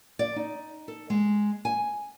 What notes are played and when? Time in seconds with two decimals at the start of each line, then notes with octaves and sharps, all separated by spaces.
0.19 D5
0.36 D#4
0.88 A4
1.10 G#3
1.65 G#5